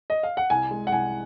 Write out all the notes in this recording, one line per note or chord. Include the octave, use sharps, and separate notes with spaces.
D#5
F5
F#5
C2 G#5
G#3
F#5
C2 G#5